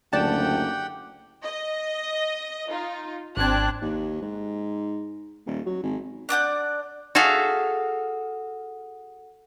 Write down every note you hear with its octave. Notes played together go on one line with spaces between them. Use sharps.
F#1 D2 G4 D5 F#5 G5 A5
D#5
D#4 F4
G#1 C4 D4 F#6 G#6
D#2
G#2
D#1
F#3
G#1
D4 D5 F#5 G6
F#4 G#4 A4 E5 F5